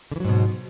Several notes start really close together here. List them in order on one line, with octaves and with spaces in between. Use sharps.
D3 E3 F#3 G#2 B2